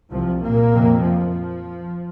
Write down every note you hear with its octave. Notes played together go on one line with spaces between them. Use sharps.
C2 C3 F3
A#2 A#3
F2 C3
F3